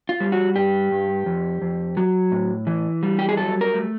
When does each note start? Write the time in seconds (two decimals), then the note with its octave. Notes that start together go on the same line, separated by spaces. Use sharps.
0.09 F4
0.20 G3
0.32 F#4
0.56 G2 G4
0.92 G2
1.26 F2
1.62 F2
1.97 F#3
2.32 A2
2.67 E3
3.03 G3
3.19 G4
3.29 G#4
3.37 F#3 A4
3.61 A#4
3.74 A3